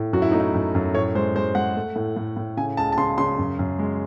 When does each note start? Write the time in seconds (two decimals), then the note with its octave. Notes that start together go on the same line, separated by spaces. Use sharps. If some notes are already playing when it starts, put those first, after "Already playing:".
Already playing: A2
0.13 F#2 F#4
0.22 E4
0.31 A3 D#4
0.40 E4
0.54 F#2
0.75 F#2
0.94 A2 C#5
1.15 G#3 C5
1.35 G#3 C5
1.55 G#3 F#5
1.75 A3
1.96 A2
2.16 A2
2.37 A2
2.57 C#3 G#5
2.77 C#2 A5
2.92 A5
2.97 C#3 C6
3.18 C#3 C6
3.38 F#2
3.59 F#2
3.79 G#3